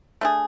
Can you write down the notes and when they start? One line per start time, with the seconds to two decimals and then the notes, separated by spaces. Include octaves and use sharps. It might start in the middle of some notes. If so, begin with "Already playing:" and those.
0.21 A3 D4 G#4